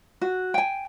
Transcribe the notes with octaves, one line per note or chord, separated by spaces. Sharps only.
F#4
G5 G#5